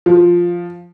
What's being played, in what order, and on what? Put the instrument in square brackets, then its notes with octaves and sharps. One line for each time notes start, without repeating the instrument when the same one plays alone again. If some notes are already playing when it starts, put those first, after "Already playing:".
[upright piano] F3